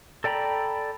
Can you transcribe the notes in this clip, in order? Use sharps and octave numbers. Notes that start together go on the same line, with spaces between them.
A4 D5 G5 A#5 B5